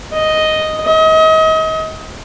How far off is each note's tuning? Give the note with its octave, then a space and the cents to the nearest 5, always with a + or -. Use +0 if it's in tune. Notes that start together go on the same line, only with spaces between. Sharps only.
D#5 +0
D#5 +35